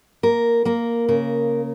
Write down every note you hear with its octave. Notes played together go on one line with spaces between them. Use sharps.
A#3 A#4
A#3 A#4
C#3 A#4